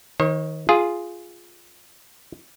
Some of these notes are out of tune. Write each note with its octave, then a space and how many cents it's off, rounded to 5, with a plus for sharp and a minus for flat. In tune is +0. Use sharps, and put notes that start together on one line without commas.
D#3 +20 C#5 -45
F4 +0 G#4 +0